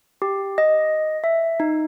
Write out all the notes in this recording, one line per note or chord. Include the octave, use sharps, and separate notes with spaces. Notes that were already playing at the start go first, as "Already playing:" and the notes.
G4
D#5
E5
D#4